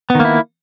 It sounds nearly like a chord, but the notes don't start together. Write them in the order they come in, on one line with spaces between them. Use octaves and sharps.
B3 D#3 A#3 E4